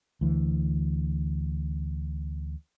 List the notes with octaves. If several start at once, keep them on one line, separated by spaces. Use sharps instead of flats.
D2 E3